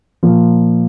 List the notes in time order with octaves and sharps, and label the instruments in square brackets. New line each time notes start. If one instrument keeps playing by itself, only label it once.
[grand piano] A#2 F3 A#3